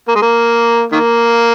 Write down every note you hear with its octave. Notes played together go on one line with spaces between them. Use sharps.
A#3
G#3
A#3
D#3 A#3